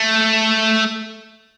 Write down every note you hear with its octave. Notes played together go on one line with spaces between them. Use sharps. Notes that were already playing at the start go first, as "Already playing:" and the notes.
Already playing: A3